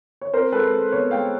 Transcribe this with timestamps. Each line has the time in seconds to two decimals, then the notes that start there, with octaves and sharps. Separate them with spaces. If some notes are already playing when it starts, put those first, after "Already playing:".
0.21 C#5
0.34 C4 A#4 C5
0.52 G#3 A4 B4
0.72 G#3
0.92 B2 B4 C#5
1.11 G#3 F5 G5